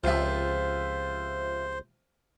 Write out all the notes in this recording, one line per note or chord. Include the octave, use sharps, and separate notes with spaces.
C#2 C3 F3 F4 C5 E5